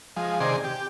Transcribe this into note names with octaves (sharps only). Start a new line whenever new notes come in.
F3 G#3
C3 D#3 G#4 D5 C6
G4